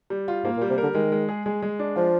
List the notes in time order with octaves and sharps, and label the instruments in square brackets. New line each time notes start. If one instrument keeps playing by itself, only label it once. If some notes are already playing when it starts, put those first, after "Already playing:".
[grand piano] G3
F4
[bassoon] G#2 [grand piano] A#3
[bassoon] A#2
[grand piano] G3
[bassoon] C3
[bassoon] D3 [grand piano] A#4
[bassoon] D#3 [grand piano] G#3
[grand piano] G#3
G#4
G#3
G#3
D4
[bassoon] F3 [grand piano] F4